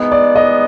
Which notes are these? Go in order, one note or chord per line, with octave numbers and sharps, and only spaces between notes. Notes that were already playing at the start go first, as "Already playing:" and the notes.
Already playing: G#2 E3 G#3 B3 D#4
D5
D#5